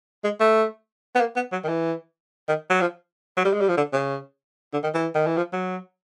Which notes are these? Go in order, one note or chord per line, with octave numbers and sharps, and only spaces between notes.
G#3
A3
B3
A#3
B3
F#3
D#3
E3
D#3
F#3
F3
F#3
G3
G#3
G3
F3
D3
C#3
D3
D#3
E3
D#3
E3
F3
F#3